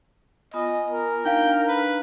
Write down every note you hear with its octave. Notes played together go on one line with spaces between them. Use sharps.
B3 F4 D#5 G#5
A#4
D4 D#4 F5 G5
B4